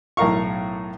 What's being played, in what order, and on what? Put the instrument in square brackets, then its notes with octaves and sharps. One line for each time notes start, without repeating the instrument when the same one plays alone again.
[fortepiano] B1 A2 A#4 F5 C#6